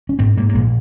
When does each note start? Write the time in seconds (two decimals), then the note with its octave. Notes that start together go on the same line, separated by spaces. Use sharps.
0.09 C#4
0.19 G#2 C4
0.37 G#2 A#3
0.49 A#3
0.55 A#1 G#3